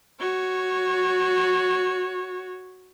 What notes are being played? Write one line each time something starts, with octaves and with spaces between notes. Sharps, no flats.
F#4 C#5